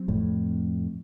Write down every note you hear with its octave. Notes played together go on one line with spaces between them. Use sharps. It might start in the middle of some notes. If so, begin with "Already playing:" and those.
Already playing: F#3 C4
F2 A2